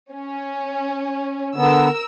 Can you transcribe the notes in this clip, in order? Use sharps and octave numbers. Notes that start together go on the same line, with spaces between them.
C#4
D3 B3 A#4 E6